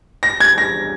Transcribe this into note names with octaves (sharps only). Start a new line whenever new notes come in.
A#6
G#6
A#6